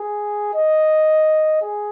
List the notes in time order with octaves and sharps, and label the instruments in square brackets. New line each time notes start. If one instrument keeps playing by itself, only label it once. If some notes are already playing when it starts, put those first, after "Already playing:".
Already playing: [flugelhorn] G#4
D#5
G#4